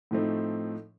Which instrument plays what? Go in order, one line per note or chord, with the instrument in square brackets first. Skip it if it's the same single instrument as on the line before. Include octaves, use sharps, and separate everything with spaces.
[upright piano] A2 F3 A3 C4 D#4